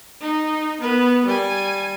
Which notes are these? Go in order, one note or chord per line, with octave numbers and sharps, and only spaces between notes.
D#4
B3 B4
G3 G#5